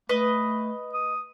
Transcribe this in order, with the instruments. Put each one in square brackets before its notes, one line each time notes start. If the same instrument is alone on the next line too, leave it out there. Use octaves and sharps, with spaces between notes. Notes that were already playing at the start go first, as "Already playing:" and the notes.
[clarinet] A3 [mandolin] B4 D#5
[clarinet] D#6